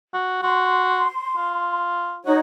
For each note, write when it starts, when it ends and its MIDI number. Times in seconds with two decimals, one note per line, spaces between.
0.14 0.37 66
0.43 1.05 66
0.43 1.79 84
1.37 2.19 65
2.26 2.39 63
2.26 2.39 66
2.26 2.39 73